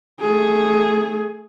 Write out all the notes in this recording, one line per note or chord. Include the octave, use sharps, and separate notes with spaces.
A3 G#4